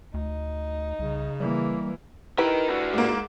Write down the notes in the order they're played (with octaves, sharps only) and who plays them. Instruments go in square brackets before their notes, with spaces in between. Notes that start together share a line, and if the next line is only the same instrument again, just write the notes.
[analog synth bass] D2 [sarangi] D#4
[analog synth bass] C2 [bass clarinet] C#3
[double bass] E3 A#3 [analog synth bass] G3
[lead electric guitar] D#4 A#4 [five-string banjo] E4 G4 B4
[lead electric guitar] D4 F#4
[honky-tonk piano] G#2 A#3